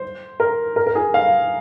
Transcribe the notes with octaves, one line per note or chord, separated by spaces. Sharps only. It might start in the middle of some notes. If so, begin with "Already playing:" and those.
Already playing: C5
A#4
A#4
A#4
G#4
F5